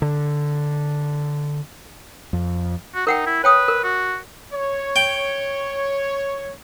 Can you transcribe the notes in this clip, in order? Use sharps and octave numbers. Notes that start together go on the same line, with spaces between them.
D3
F2
F#4
D#4 A#4 F#5 G5
E4
B4 C#5 G5 D#6
A#4
F#4
C#5
G5